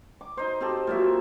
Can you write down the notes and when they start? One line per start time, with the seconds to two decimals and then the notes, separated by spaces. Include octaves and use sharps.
0.21 D6
0.37 D#4 C5
0.61 C4 G4 A4
0.87 A#2 F#3 E5